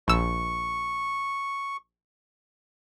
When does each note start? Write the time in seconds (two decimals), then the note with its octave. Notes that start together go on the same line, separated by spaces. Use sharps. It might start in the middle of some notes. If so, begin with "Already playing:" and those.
0.08 A#1 C#6 E6